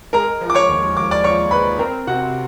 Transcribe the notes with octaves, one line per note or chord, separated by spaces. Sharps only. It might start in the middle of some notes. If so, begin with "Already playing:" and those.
G#3 A#4 A#5
F3
D6
C#5 C#6
D#2
D#2 D6
D5 D6
F3 C#5 C#6
G#3 B4 B5
C4 A#4 A#5
C3 F#4 F#5